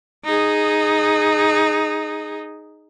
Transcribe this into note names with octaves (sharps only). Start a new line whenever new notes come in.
D#4 G#4